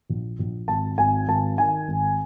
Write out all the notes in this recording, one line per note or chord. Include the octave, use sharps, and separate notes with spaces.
A#1
A#1
G#1 A5
G#1 G#5
G#1 A5
D#3 G#5
G#1